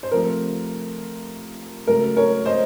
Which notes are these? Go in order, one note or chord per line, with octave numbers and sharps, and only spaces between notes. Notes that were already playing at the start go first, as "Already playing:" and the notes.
C5
C3 F3 A3 A#4
C#3 F#3 A3 A#4
A#4 C#5
C5 D#5